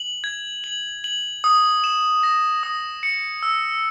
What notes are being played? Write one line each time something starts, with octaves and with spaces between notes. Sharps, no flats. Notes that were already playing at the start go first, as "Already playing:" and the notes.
Already playing: F#7
G#6
F#7
F#7
D#6
E7
A#6
D#6
C#7
E6